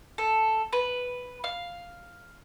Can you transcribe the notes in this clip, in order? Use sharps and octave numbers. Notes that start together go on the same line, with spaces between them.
A4
B4
F5